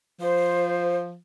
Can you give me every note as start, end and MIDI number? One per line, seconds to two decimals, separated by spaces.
0.21 1.17 53
0.21 0.95 72